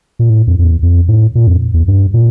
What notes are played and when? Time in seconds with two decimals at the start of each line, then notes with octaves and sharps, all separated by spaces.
0.19 A#2
0.30 A2
0.47 F2
0.59 F2
0.64 E2
0.83 F2
1.08 A2
1.35 A#2
1.47 F2
1.74 E2
1.88 G2
2.14 A#2